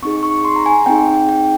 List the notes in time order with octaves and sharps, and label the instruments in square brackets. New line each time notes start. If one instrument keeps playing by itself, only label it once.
[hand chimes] C4 D#4 G#4 C#6
C#6
C#6
C6
A#5
G#5
C4 D#4 G#4 G5
G5
G5